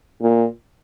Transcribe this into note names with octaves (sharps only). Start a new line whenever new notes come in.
A#2